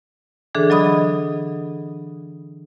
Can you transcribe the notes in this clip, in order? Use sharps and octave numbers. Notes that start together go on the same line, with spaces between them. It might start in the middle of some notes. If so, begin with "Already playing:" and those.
D3 E3 D4 G#4 A4
F#3 D#5 B5 D#6